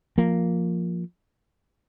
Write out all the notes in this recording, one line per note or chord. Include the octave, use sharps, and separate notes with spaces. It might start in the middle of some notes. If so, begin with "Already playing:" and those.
F3 A#3